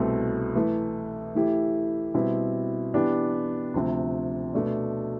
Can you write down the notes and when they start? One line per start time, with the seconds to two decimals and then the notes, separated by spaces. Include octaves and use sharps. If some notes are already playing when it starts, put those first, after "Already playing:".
Already playing: C2 B2 A3 C4
0.55 E3 A3 E4 B4
1.35 E3 A3 E4 G4
2.14 B2 G3 C4 E4
2.94 E3 B3 D4 G4
3.74 D2 C3 F3 C4
4.54 B2 A3 D4